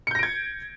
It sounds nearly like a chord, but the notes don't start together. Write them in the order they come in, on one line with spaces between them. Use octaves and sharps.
C#7 G6 A#6 D7 G#6